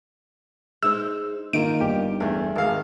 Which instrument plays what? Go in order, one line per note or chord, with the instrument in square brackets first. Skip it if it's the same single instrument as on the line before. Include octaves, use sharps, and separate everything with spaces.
[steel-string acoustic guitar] G#3 D#4 C5 [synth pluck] E6
[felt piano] D#3 A#3 [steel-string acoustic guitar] D#4 F4 A#4 [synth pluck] D7
[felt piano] G1 [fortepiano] G4
[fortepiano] E2 [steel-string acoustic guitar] A3 D4
[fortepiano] G#1 D#3 F5 [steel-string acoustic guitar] A5